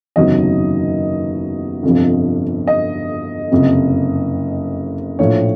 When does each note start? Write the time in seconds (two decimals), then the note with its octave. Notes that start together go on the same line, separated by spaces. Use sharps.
0.16 F#1 E2 C3 D#3 F#3 D#5
1.83 G1 F2 C3 F3
2.67 D#5
3.51 F#1 F2 C3
5.19 A#1 A2 F3 C#5